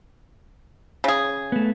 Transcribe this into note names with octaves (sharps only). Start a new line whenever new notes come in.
C#3 G#4
A3 B3